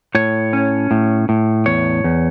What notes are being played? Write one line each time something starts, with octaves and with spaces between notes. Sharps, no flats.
A2 C#5
C#4
A2
A2
E2 C#5
E2